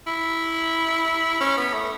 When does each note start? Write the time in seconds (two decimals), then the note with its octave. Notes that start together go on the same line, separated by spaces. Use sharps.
0.07 E4
1.41 C#4
1.58 B3
1.74 A3